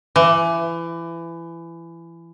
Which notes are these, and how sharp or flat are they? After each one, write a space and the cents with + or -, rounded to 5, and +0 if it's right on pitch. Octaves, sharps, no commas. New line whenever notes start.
E3 +25